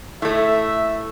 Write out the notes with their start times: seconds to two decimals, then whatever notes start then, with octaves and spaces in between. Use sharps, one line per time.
0.22 A2 A3 E5